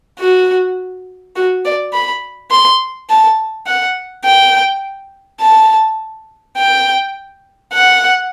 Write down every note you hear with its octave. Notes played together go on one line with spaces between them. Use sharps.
F#4
F#4
D5
B5
C6
A5
F#5
G5
A5
G5
F#5